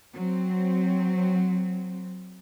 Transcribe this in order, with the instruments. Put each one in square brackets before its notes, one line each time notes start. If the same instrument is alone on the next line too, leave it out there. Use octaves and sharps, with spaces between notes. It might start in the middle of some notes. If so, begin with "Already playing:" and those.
[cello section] F#3 C4